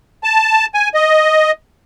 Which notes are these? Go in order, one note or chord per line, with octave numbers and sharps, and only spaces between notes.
A5
G#5
D#5